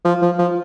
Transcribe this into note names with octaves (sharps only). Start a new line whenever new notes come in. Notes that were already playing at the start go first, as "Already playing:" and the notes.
F3
F3
F3